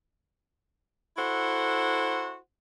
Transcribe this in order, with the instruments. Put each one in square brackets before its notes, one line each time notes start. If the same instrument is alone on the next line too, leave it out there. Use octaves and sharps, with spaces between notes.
[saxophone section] E4 F#4 A4 C5 F#5